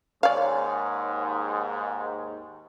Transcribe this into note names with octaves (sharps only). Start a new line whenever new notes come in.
D#2 G#2 C#5 D5 F5 G#5 B5